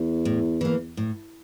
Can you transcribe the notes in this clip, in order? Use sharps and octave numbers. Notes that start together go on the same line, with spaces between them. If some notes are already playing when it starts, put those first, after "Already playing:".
Already playing: E2
A2
E3 A#3
A2